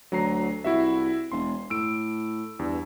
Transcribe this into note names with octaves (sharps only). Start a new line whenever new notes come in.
D2 F#3 A#5 C7
C2 E4 F#4 E5
E1 C6
A2 E6 D7
E2 G2